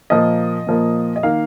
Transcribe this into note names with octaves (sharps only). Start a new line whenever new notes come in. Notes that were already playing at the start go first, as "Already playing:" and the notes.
A#2 F3 A#3 D#5
A#2 F3 A#3
D#5
D#3 A#3 F5